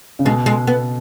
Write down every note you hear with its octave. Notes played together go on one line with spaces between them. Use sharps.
C#3
B2 G#3
G#3
B3